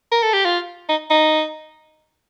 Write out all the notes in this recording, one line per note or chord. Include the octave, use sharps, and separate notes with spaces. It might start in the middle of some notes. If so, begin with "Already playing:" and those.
A#4
A4
G4
F4
D#4
D#4